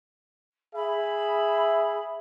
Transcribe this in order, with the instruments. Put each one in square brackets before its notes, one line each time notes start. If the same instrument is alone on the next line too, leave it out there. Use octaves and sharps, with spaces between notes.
[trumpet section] G#4 E5 [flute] B5